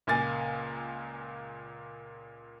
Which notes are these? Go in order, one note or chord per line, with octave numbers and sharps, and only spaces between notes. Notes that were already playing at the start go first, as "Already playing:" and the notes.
C#2 A#2 A#3 G#5 A6